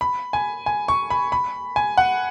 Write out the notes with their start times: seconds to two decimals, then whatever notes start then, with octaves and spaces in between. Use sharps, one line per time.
0.01 B5
0.33 G#5
0.66 G#5
0.88 C#6
1.10 B5
1.32 B5
1.76 G#5
1.97 F#5